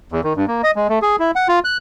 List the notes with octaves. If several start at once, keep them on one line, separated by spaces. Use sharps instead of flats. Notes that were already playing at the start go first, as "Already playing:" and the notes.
E2
D#3
G2
A#3
D#5
G#3
A3
G#4
E4
F#5
F4
F#6